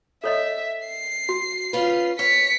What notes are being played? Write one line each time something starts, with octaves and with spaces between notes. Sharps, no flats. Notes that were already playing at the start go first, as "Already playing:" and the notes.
A4 C#5 D#5 E5
C7
F#4
C#4 F4 B4
B4 C#5 B6 C#7